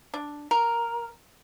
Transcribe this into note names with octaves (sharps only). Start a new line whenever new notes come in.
D4
A#4